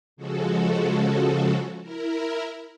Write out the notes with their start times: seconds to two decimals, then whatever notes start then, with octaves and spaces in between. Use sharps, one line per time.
0.17 C#3 F3 G#3 F#4 A4
1.81 E4 A#4